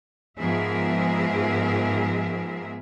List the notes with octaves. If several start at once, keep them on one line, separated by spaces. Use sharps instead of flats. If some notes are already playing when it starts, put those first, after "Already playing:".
G#2 F3 B3 G#4 A#4 E5